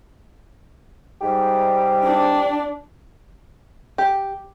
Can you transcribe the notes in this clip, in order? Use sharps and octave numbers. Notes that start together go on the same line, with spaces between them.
G#2 G3 G4
D4
G4